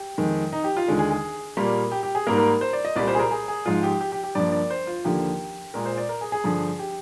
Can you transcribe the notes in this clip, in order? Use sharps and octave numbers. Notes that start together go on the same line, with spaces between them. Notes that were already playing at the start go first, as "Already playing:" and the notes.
Already playing: G4
F2 D#3 G#3
D#4
G4
F4
D#2 D3 G#3
G#4
G#4
A#2 G3 A#3
G4
G4
G#4
G#2 G3 A#3 A#4
A#4
C5
D5
D#5
C2 A#2 G3 D5
C5
G#4
A#4
G#4
G#4
G#2 F3 G#3 F4
G4
G4
G4
G4
G2 F3 A#3 D5
D5
C5
F4
D#2 D3 F3 A#3 G4
A#2 G#3 A#4
C5
D5
A#4
G#4
G#4
G2 D3 F3
G4